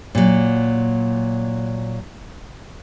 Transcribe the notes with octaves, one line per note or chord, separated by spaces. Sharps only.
A#2 F#3